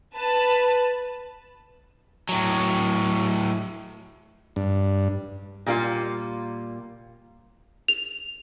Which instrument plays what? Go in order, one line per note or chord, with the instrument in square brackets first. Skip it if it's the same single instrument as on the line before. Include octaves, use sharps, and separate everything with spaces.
[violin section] B4 A5
[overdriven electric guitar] A2 F#3
[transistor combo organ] G2
[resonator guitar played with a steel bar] A#2 G3 A#3 F4
[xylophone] F7